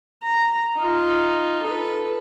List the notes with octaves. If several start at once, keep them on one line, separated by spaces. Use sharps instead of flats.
A#5
D#4 F4
A4 B4